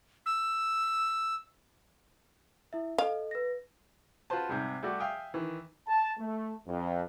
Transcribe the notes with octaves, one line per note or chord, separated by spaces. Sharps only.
E6
E4 E5
A4 D#5 F5
B4 A#6
F4 F#4 B4 C5 A5
G#2 C3 G3
G3 A3 F#4 D5
E5 F5 G5 G#5 D#6
D#3 E3
A5
A3
F2